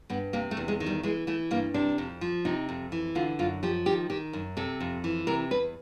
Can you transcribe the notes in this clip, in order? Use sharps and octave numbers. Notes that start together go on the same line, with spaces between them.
G2 B3
C3 A#3
A3
E2
G#3
D#3
G3
E3 G#3
E3 A3
G2 A#3
C3 D4
F2
F3
C3 D#4
F2
E3
D3 F4
F#2 F4
F3 G4
D#3 G4
D#3 G4
F#2
C3 A4
F2
E3
C3 A#4
E2 B4